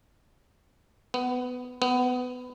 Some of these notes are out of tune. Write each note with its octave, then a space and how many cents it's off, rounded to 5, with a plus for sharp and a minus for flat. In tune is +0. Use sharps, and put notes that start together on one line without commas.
B3 +15
B3 +20